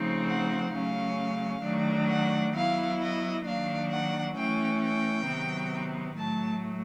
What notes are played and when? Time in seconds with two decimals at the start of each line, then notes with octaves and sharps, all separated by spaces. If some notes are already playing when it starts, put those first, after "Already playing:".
Already playing: C#3 F3 A3 C4 D#4
0.27 F#5
0.72 C#3 F#3 A3 C#4 F5
1.63 D#3 F#3 A3 D4
2.09 F#5
2.54 F#3 B3 E4 F5
3.00 D#5
3.45 D#3 F#3 A#3 D4 F5
3.90 F#5
4.36 E3 A3 C#4 G5
4.81 G5
5.27 C3 D#3 F#3 B3
6.18 A2 F#3 A3 A5